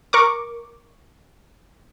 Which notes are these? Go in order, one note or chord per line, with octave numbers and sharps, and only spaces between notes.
A#4 C#6 D6